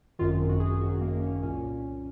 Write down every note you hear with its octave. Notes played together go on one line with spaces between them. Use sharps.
G#1 F#2 D#3 F4
F#4
G#4
G#1 F#2 D#3 F#4
A#3
C#4
C2 A#2 C#4